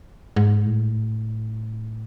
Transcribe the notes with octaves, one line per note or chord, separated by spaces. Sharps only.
G#2
A2